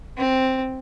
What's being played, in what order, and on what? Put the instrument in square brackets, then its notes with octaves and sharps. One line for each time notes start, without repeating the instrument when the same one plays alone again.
[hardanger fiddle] C4